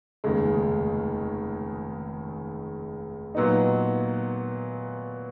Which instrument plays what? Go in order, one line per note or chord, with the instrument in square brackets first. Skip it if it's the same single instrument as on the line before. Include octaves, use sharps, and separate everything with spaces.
[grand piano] F1 D#2 C#3 G#3
A#2 F#3 B3 D#4